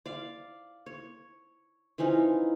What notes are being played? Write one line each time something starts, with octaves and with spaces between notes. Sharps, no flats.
D5 F5
C#5
E3 F3 C#4 D#4